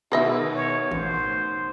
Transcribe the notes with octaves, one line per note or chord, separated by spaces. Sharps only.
B2 D#3 E4 G#4 D#5 E5
C#5
A1 C5